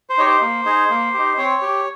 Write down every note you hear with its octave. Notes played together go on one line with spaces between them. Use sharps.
C5
D#4 G4 C#5
C5
A#3
D#4 G#4
A#3
D#4 G4
C4 C#5
G4